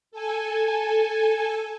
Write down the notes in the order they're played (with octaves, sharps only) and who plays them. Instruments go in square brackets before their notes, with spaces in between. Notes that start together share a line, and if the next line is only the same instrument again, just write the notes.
[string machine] A4 G#5